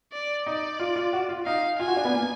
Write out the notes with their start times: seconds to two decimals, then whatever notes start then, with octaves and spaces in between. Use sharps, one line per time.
0.12 D5
0.46 D#4 D5
0.79 F4
0.96 F4
1.13 F#4
1.29 F4
1.46 D#4 F5
1.79 F4 G#5
1.88 F#4
1.97 D4
2.05 B3
2.13 A#3